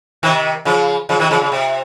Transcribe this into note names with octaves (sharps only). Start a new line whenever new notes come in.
C3 D#3
C#3 F3
C#3 F3
C3 D#3
C#3 F3
C#3
C3